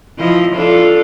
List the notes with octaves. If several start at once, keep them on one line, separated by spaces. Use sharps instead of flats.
F3 E4 D#5
D4 F4 A4